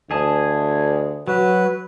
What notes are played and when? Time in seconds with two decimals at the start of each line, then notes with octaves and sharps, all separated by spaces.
0.11 D2 G#4 D#5 A5
1.28 F#3 F#4 B4